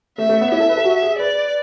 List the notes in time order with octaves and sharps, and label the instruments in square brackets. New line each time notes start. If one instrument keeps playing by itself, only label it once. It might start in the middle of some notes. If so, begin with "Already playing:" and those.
[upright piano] A3 [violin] E5
[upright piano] A3
B3
[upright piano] E4 [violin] E5
[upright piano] A4
B4
A4
F#4
G#4
[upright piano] B4 [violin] D5